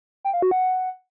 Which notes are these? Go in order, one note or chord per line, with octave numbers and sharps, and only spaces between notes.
G5
F5
F#4
F#5